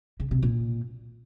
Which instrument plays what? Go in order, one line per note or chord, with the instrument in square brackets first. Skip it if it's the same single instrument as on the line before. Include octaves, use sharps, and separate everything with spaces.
[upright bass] C#3
C3
A#2